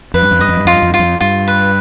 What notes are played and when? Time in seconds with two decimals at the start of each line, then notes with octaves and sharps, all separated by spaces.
0.14 F2 B4
0.22 G2
0.31 F2
0.40 G2 D#5
0.48 F2
0.57 G2
0.65 F2 F4
0.73 G2
0.82 F2
0.91 G2 F4
0.99 F2
1.20 G2 F4
1.48 B4